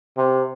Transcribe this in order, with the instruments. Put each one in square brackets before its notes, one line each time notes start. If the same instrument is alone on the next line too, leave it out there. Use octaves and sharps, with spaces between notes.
[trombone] C3